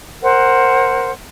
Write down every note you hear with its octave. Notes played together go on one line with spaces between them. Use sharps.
A#4 C5 F#5